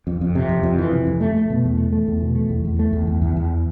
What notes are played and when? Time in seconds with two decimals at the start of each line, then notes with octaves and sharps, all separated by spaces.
0.07 F2
0.21 F2
0.35 C3
0.49 F2
0.63 F2
0.78 E3
0.93 C3
1.07 F2
1.21 A3
1.35 A3
1.50 B2
1.65 E2
1.78 A3
1.93 A3
2.08 E2
2.22 B2
2.36 A3
2.50 E2
2.65 E2
2.79 A3
2.93 E2
3.07 E2
3.22 E2
3.37 E2